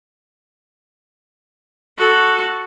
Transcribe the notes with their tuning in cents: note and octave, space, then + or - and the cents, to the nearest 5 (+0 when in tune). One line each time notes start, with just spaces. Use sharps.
F#4 +0 A4 +0